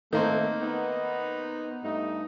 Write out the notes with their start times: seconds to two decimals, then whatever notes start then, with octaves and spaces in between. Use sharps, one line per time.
0.13 D#3 A3 A#3 C4
0.62 B3 D#4
1.84 G2 A3 D#4